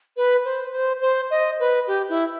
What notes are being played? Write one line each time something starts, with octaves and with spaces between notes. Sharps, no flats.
B4
C5
C5
C5
D#5
B4
G4
E4